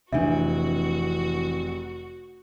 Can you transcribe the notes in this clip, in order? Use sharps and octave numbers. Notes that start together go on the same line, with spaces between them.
F1 C3 E3 D4 F#4 E5